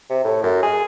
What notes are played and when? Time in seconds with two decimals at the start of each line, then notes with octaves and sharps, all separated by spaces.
0.10 C3
0.24 A2
0.43 F#2
0.63 G#4